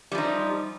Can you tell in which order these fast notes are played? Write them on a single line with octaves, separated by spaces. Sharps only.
G3 F3 D#4